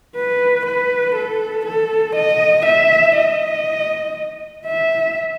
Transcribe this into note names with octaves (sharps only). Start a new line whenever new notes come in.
B4
B4
A4
A4
D#5
E5
D#5
E5